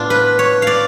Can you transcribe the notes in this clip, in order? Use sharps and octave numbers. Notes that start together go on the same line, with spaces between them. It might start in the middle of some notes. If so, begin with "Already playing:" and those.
Already playing: A2 B3 D4 F4
B4
C#5
D5 F5